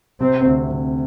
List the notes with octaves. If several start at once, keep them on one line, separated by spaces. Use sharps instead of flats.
C3 C4
D2
C3